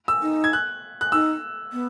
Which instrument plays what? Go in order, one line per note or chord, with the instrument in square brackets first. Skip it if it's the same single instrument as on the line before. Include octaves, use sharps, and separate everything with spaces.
[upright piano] E6
[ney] D#4
[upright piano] G#6
F#6
F#6
[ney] D#4 [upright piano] E6
[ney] B3